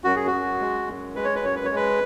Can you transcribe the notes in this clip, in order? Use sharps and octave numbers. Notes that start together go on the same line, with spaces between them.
F#2 F#4
G#4
F#4
F#2
G#3
F#2
G#3 B4
C#5
B4
F#2 C#5
B4
G#3 C#5
B4